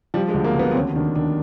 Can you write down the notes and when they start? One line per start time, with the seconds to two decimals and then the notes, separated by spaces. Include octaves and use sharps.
0.14 F3 G3
0.29 G#3
0.34 D2
0.44 A#3
0.55 D2 B3
0.71 C4
0.75 D#2 C#4
0.96 D#3 D4
1.16 D#3 D4